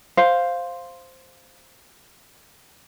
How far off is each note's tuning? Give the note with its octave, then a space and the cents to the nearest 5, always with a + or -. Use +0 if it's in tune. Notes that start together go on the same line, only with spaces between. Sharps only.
C5 +0 F5 +0